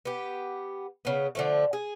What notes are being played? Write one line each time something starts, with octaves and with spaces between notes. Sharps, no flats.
B3 G4
C#3 B3
D3 F3 A3
G#4